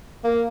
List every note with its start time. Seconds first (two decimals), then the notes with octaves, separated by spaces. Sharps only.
0.24 A#3